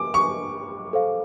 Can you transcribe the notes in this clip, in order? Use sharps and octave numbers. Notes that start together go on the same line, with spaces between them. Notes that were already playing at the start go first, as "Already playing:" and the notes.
Already playing: D6
C#6
A4 C5 F5